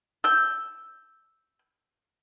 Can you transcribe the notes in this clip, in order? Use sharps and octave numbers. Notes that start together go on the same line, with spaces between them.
E6 G6